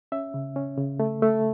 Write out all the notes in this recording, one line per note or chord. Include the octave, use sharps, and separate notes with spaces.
C#4 E5
C#3
C#4
C#3
A3
A3